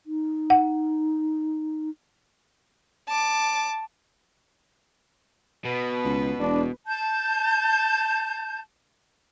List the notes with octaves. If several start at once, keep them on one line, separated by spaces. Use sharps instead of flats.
D#4
F#5
A5 D6
B2 B4
C#2
E1 D4
A5 G6